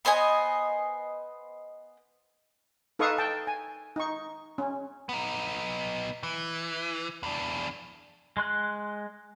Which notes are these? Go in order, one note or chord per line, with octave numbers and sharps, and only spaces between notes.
B3 C5 D#5 G#5
D#4 A4 B4 F5 C#6 D#6
G5 A5
G#5
D#4 C#6
C#4
B3 D#4
E3
E2 D4
G#3 C6 F#6